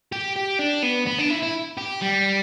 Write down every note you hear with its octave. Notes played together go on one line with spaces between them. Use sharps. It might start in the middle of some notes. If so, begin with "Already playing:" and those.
G4
G4
D4
B3
B3
D4
E4
E4
G4
G3